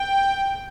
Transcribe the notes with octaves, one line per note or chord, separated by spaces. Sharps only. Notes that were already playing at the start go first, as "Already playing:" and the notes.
Already playing: G5